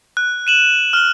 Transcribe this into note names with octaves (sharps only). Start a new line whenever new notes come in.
F#6
D#7 E7 F#7
F6 G7